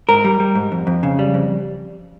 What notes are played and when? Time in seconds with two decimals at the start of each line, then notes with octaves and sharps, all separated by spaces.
0.09 G#2 A#4
0.24 G3
0.40 G3
0.55 G#2
0.72 F2
0.87 F2
1.03 C#3
1.19 G3
1.34 F2